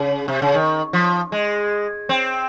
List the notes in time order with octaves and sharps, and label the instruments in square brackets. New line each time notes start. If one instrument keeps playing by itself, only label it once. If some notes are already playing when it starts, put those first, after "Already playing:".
Already playing: [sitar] C#3
C3
C#3
D#3
F3
G#3
C4